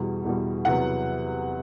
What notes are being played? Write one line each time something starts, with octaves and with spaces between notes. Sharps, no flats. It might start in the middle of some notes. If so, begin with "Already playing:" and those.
Already playing: E2 B2 G3
E2 B2 G3
E2 C3 F#3 B3 F#5